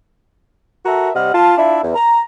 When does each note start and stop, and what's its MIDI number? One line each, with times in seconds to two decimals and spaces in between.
0.85 1.10 66
0.85 1.10 69
0.85 1.10 70
0.85 1.10 76
0.85 1.10 82
1.15 1.31 48
1.15 1.31 55
1.15 1.31 75
1.15 1.31 78
1.15 1.31 89
1.33 1.54 65
1.33 1.54 81
1.57 1.78 62
1.57 1.78 64
1.57 1.78 65
1.57 1.78 76
1.82 1.92 40
1.95 2.22 82